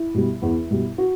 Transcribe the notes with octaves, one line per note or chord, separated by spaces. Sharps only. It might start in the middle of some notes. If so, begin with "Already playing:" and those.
Already playing: E4
B2 G3
E2
B2 G3
F#4